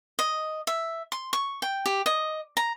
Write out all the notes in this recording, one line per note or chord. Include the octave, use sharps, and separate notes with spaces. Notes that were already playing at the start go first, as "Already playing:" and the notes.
D#5
E5
C6
C#6
G5
G4
D#5
A#5